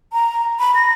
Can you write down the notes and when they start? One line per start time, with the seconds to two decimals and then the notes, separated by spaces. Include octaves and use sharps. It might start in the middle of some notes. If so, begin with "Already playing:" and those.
0.13 A#5
0.59 B5
0.75 A#6